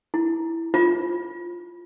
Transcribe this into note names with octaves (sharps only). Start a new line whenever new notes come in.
E4
F4